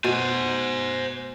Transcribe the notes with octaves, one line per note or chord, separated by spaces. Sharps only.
B2 C5 G#5